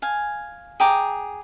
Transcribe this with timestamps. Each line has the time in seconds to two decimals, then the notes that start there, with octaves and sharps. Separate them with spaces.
0.02 F5 G#5
0.80 G#4 G5 A#5 D6